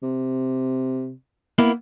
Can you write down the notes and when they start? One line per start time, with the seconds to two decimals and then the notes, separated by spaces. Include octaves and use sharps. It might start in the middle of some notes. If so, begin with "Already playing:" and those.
0.03 C3
1.58 A#3 B3 E4